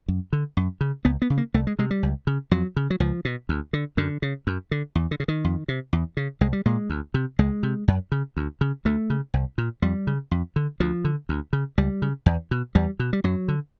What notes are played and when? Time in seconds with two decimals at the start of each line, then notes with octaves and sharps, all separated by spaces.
0.08 F#2
0.33 D3
0.57 F#2
0.81 C#3
1.05 C#2 B3
1.22 B3
1.30 C#3
1.38 A#3
1.54 C2 A3
1.67 G#3
1.79 C3 G#3
1.91 G3
2.03 C#2
2.27 C#3
2.51 F2 F#3
2.76 C#3
2.90 F#3
3.00 C#2 F3
3.25 B2
3.49 D2
3.73 D3
3.97 F#2 D3
4.22 C#3
4.47 F#2
4.71 D3
4.95 E2
5.11 D3
5.20 C#3
5.28 D#3
5.44 F2
5.68 C3
5.93 E2
6.17 C#3
6.41 C2 G#3
6.53 G3
6.66 A#2 G#3
6.90 D2
7.14 C3
7.39 C#2 G#3
7.63 C3
7.88 F#2
8.12 C#3
8.37 D2
8.61 C#3
8.85 D2 A3
9.10 C#3
9.34 C2
9.58 A#2
9.82 F2 G3
10.07 C#3
10.31 F2
10.56 D3
10.80 D2 F3
11.05 D3
11.29 D2
11.53 C#3
11.78 C#2 G3
12.02 C#3
12.26 E2
12.51 B2
12.75 E2 G3
12.99 B2
13.13 G3
13.24 F#2 F#3
13.48 D3